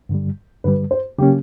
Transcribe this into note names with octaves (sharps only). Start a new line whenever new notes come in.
G2 D3 G3
G2 D3 G3 B4
C5
C#3 F#3 A#3 C#4 G4